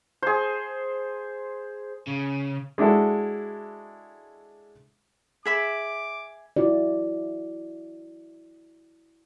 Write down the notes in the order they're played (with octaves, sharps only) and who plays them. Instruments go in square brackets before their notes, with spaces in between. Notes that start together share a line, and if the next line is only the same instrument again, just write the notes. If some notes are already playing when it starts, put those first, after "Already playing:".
[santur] G#4 C5
[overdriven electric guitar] C#3
[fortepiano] G#3 D4 E4 F#4 A4
[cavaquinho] G#4 E5 B5 [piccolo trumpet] D6
[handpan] E4 F#4 D5